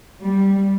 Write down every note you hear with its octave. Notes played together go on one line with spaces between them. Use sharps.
G3